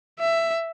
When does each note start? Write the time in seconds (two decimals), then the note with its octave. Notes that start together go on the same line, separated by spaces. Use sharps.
0.20 E5